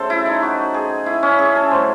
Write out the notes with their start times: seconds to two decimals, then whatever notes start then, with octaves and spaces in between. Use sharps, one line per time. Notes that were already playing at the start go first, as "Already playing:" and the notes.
Already playing: C#3 F#3 A3 A4 C5
0.10 E4
0.26 D#4
0.42 F#4
0.74 G#4
1.06 E4
1.23 C#4
1.38 G#4
1.55 A4
1.71 A2 F#3 A3 C5